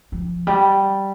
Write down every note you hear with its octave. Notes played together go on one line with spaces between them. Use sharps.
F3
G3